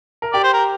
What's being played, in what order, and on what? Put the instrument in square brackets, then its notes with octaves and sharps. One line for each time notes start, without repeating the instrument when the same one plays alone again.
[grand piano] A#4
[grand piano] G4 [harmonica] D5
[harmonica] C5
A#4